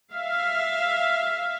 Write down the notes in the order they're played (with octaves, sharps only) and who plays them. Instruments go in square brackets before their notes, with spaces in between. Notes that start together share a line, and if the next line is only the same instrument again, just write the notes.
[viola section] E5 F5